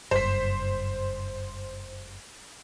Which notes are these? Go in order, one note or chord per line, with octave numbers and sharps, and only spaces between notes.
F#1 G2 C5 B6